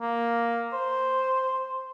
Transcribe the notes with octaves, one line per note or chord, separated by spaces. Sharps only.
A#3
C5